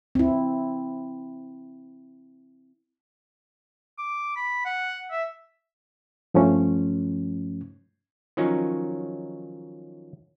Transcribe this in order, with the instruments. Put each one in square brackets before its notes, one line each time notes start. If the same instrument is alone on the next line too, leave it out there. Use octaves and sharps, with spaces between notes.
[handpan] C4 E4
[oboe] D6
B5
F#5
E5
[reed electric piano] G2 F3 A3 C#4
[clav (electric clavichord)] D#3 F3 F#3 C#4 D#4